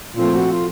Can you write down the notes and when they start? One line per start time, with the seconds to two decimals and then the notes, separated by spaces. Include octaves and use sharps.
0.15 A#2 F3 A3 C4 F4
0.33 F#4
0.49 F4